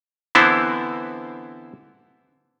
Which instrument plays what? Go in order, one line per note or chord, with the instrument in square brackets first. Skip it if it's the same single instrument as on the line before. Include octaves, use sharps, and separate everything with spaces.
[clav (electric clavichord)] D3 E3 B3 C4 E4 C5